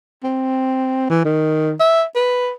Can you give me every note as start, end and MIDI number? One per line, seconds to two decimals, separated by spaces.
0.24 1.09 60
1.10 1.23 52
1.25 1.73 51
1.80 2.04 76
2.15 2.51 71